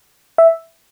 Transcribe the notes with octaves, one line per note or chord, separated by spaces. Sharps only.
E5